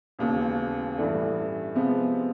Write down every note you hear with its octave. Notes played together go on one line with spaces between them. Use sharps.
E1 D#2 C#3
A1 G2 E3 A3 D4
C3 F3 G#3 B3